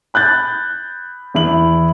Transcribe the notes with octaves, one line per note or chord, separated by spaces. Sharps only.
B5 F#6 G6 A6
E2 E4 F#7